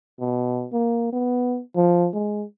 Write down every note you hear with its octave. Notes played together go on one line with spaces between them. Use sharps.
B2
A#3
B3
F3
G#3